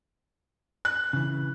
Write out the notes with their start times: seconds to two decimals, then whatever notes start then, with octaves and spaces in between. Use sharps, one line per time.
0.85 F#6
1.13 C#3 E3